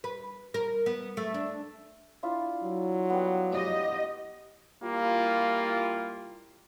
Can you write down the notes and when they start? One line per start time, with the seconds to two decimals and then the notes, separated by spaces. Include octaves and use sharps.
0.04 B4
0.54 A#4
0.86 B3
1.17 A3
1.34 D4
2.23 D4 E4 F4
2.63 F#3
3.10 G3 B3
3.52 G4 D#5
4.84 G3 A#3 E4 F4